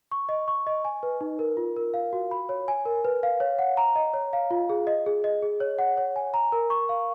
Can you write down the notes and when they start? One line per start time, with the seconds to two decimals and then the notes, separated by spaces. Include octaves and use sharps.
0.12 C#6
0.29 D#5
0.48 C#6
0.67 D#5
0.85 G#5
1.03 B4
1.21 D#4
1.39 A#4
1.57 F4
1.76 A#4
1.94 F5
2.13 F#4
2.31 B5
2.49 C#5
2.68 G#5
2.85 A#4
3.05 B4
3.23 F5
3.40 C#5
3.59 F#5
3.77 A#5
3.96 D#5
4.14 C#5
4.33 F5
4.51 F4
4.69 G#4
4.87 D#5
5.06 G#4
5.24 D#5
5.43 G#4
5.60 C#5
5.79 F#5
5.97 C#5
6.16 G#5
6.34 A#5
6.52 A#4
6.70 C#6
6.89 F5